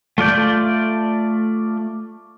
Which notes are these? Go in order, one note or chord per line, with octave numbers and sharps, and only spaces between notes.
A3 F4 D5 G6